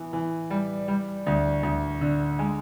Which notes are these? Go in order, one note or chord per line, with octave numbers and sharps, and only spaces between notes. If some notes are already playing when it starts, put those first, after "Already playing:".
Already playing: E3 B3
E3
G3
G3
D2
D2
D3
G#3